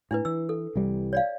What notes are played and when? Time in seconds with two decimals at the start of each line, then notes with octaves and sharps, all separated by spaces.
0.11 A2 D4 E4 B4
0.25 E3 E6
0.49 A4
0.75 C2 E3 G3
1.13 C#5 D5 F5